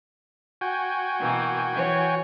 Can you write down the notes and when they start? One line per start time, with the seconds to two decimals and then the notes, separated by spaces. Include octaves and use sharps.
0.61 F#4 G5 G#5
1.20 B2 E3 A#3
1.72 E3 C#5